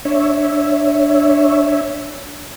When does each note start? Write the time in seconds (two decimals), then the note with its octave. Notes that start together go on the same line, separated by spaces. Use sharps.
0.05 D4 C#5 E5